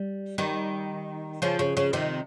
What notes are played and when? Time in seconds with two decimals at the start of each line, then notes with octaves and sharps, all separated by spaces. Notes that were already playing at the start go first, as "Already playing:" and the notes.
Already playing: G3
0.38 D#3 G3
1.42 C#3 F3
1.59 C#3
1.77 C#3
1.93 C3 D#3